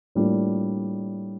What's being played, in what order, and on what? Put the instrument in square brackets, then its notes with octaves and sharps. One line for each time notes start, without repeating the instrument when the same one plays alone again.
[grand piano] A2 G3 A#3 D4 F4